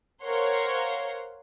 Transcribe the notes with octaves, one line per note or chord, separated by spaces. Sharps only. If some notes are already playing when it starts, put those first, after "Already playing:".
A#4 C5 C#5 F5 F#5 C6